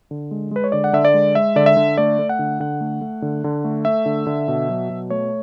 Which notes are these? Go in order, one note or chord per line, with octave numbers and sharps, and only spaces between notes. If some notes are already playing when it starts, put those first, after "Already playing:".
D3
G#3
G#3 B4
C#5
D3 D5
F#5
D3 E5
D5
G#3
G#3 E5
D3 D5
E5
D3
A3 D5
A3
F#5
D3
D3 F#5
A3
A3
D3
D3
A3
A3 E5
D3
D3
B2
F#3
B2
A3 C#5